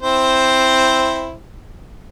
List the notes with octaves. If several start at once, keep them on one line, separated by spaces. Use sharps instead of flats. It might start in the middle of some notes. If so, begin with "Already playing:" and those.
C4 E4 C5